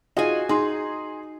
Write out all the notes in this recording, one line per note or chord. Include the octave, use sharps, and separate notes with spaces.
D#4 F4 F#4 G#4 G#5
D#4 G#4 C6